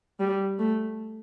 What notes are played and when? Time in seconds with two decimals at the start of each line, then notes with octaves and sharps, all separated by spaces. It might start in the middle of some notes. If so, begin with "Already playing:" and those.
0.20 G3
0.59 A3